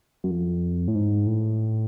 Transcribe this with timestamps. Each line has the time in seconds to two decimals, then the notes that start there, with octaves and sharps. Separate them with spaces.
0.24 F#2
0.31 F2
0.88 A2
0.95 G#2
1.27 A2